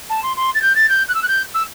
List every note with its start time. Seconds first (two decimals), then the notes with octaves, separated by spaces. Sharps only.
0.10 A5
0.23 C6
0.37 C6
0.55 A6
0.62 G6
0.75 A6
0.89 G6
1.08 F#6
1.15 E6
1.23 F#6
1.28 G6
1.54 E6